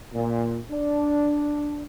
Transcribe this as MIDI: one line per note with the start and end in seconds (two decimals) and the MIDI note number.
0.13 0.57 46
0.70 1.83 62